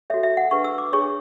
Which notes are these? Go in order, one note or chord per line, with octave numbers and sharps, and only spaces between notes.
F#4 A4 C#5 E5
E5
F#5
D4 G#4 B4 C#6
E6
D6
D4 G#4 C#5 C#6